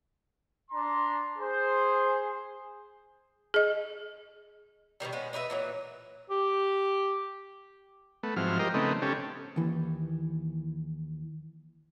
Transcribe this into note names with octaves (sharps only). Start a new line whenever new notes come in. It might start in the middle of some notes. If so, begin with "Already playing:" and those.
D4 A#5 C6
G#4 C5
G#4 D#5
B2 D3 D#3 G3
G#3 B3 C#4
D4 D#4 B4 E5
A#2 E3 F#3
G4
A3 B3
G#2 F3 F#3 C4 E4 F6
F4 G4 A#4 C5 D#5
C#3 A3 B3 C4 D#4
C#3 C#4 G4 A4
D#2 E3